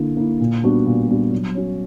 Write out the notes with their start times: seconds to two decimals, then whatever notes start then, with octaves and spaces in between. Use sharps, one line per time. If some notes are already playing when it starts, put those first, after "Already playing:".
Already playing: D3 A#3 E4
0.17 A#3 E4
0.40 A#2
0.63 G3 B3 D4 F#4
0.86 A#2
1.08 G3 B3 D4 F#4
1.32 F#3
1.55 C#4 F#4